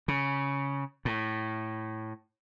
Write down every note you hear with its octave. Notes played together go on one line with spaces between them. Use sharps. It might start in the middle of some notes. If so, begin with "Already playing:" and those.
C#3
A2